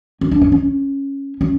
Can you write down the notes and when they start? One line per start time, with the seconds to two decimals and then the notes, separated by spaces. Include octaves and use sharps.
0.21 C#4
0.31 D4
0.41 C#4
0.52 C#4
1.41 C#4